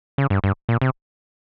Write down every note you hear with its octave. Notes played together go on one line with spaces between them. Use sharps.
C#3
G2
G2
A#2
C3